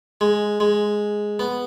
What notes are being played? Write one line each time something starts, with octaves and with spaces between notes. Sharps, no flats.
G#3
G#3
B3